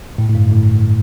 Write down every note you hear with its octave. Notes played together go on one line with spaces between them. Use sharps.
A2
A2
G2
A2